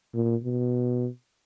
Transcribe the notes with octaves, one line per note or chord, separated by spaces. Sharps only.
A#2
B2